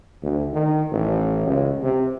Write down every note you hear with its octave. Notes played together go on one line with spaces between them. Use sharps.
D2
D#3
A1
C#2
C3